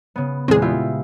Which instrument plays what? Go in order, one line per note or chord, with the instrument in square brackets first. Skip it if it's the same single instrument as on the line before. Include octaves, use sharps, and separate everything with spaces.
[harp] C#3 B3
[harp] E2 A#2 G#3 [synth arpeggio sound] C4 G#4
[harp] E4 F4 G4